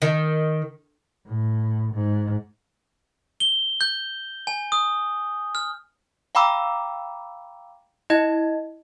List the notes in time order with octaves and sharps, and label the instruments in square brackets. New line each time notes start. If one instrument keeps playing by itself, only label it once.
[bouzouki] D#3
[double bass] A2
G#2
[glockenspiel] G7
G6
G#5
D#6
F6
[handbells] F5 G5 A#5 B5 D6 E6
E4 D#5 G#6